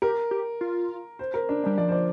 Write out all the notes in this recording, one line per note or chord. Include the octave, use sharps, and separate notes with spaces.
G4 A#4
G4
F4
C5
A#4
D4
G3 D4
F3 D5
C5
D5